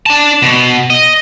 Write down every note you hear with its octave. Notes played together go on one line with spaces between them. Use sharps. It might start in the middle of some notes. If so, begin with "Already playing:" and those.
D4 A5
B2
D#5